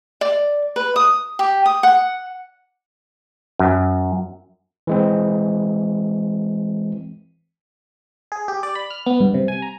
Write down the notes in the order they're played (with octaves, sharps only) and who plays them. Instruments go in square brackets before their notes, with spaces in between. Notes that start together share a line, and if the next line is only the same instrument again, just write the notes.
[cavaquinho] D5
B4
D#6
G4
D#6
F#5
[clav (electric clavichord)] F#2
[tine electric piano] E3 G#3 C4
[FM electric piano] G#4
G4
D5
B5
F6
B3
G2
C3
G#5
A#5